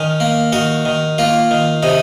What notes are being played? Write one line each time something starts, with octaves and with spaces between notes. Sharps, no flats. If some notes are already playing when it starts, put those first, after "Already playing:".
Already playing: D#3 C#4
A#3
D#3 F#4
D#3
A#3 F4
D#3
C3 D#4